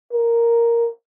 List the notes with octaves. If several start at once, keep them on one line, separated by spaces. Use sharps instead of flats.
A#4